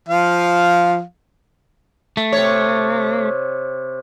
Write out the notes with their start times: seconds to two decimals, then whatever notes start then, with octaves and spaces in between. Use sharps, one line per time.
0.09 F3 F5
2.17 A3
2.32 C3 C#5